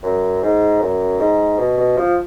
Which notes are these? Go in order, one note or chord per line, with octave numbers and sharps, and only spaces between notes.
F#2
G#2
F#2
G#2
B2
B2
F3